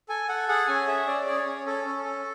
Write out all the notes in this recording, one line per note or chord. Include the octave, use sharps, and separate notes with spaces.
A4 G#5
A4 F#5
G#4 F#5
C#4 G#5
G#4 E5
C#4 D5
G#4 D5
C#5
C#4
C#4 A4
C#4
C#4